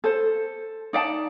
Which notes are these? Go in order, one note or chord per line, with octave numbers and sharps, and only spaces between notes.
A4 C5
D#4 D5 F5 A5